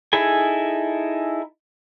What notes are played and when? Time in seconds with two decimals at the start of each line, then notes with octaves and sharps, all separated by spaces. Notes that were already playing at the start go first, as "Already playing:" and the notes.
0.13 D#4 E4 G#4 A4 G#5